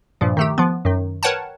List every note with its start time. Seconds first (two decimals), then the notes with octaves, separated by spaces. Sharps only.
0.21 G2 A#2 F3
0.37 D#3 A3 G4
0.58 F3 B3
0.85 F#2 D#3
1.23 A#4 B4 C#5 F#5 G5 A5